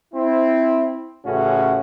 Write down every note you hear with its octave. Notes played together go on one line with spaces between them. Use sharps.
C4 E4
A1 A2 C#3 C#4 F#4